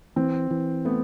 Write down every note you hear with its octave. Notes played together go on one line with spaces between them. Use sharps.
E3 C4
E3
A3 B3